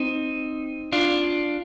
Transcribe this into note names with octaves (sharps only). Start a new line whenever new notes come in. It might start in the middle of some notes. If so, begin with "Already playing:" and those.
Already playing: C4 D#4
D4 F4